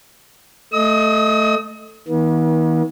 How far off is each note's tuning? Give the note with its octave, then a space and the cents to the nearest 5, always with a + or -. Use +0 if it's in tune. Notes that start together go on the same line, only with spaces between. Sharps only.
A3 +0 D#5 +0 D#6 +45
D#3 +45 B3 -45